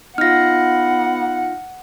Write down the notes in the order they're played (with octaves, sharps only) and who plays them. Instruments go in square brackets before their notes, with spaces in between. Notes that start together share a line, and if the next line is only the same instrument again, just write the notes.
[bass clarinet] B3 [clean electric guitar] D#4 F4 [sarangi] F#5 [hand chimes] F6 A#6